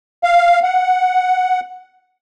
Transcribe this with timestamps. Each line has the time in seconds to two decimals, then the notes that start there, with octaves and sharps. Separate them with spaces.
0.24 F5
0.63 F#5